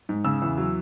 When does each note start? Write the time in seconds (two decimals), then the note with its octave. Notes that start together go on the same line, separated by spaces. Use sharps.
0.09 G#2
0.25 C#3 E6
0.42 E2
0.57 F#3